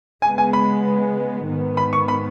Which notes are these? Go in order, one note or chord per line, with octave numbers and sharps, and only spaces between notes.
C#3 G#3 B3 G#5
G#5
B5
G#2 D#3 B3
B5
C#6
B5